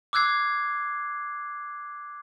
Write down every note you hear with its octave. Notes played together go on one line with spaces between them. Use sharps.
D6 E6 F#6 G#6 C7